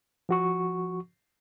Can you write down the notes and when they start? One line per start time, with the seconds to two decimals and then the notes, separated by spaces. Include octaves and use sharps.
0.29 F3 F#4 C#6